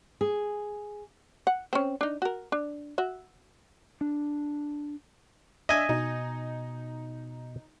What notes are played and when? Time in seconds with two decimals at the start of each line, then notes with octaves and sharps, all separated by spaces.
0.21 G#4
1.47 F#5
1.73 C4 C#4
2.01 D4 D#4
2.22 F#4 A#4
2.52 D4
2.98 F#4 E5
4.01 D4
5.69 D4 D#5 E5 G#5
5.89 B2 D#4